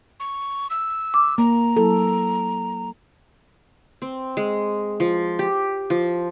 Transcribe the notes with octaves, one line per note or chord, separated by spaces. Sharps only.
C#6
E6
D6
A#3 A#5
F#3 E4 A4
C4
G#3
F3
G4
F3